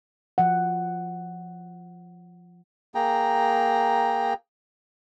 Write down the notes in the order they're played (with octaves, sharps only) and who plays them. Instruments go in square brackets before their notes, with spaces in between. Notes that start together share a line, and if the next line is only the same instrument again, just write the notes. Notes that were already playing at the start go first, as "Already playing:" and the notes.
[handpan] F3 F#5
[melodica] A#3 G#4 G5 A#5